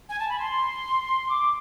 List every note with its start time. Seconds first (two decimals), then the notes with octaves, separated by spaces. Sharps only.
0.09 G#5
0.19 A5
0.29 B5
0.39 C6
1.29 D6